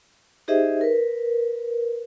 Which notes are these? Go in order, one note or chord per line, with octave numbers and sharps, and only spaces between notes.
D#4 G4 G#4 C5 D#5 E5
A#4 B4